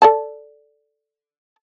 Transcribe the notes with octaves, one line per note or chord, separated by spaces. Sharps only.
A4 D5 A5